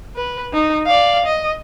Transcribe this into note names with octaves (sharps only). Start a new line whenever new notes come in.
B4
D#4
D5 F5
D#5